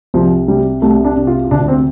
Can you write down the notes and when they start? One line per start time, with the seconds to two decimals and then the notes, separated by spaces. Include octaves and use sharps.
0.14 C2 F3
0.48 C3 G3
0.82 C2 A3
1.04 D4
1.16 C3
1.27 F4
1.45 F4
1.51 D2 D4
1.68 C4